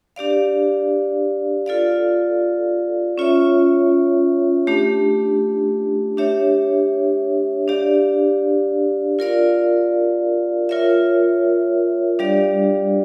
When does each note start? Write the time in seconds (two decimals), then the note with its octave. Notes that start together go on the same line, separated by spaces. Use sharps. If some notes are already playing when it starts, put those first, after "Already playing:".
0.16 D4 G4 D5 F5
1.66 F4 A4 D5 F5
3.18 C#4 F4 C#5 E5
4.67 A3 D4 G4
6.17 D4 G4 C#5 E5
7.68 D4 G4 D5 F5
9.19 F4 A#4 D5 F5
10.69 F4 A#4 C#5 E5
12.19 G3 D4 G4 D5 F5